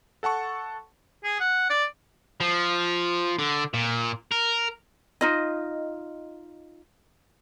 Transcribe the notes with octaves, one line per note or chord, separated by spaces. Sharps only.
A4 F#5 A5 C#6
G#4
F#5
D5
F3
D3
A#2
A#4
D#4 F4 D#5